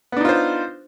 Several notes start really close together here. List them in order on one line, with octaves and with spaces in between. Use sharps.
B3 D4 D#4 F4 C5